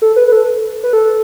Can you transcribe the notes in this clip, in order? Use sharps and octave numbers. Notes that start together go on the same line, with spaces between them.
A4
B4
B4
A4
B4
A4